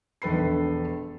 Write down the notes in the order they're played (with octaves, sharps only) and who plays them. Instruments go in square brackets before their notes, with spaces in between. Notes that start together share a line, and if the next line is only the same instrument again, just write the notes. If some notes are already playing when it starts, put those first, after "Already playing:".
[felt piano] E1 A#1 A4 B4 B5 C7